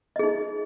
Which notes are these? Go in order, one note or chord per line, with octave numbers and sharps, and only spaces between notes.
D#4 G#4 D#5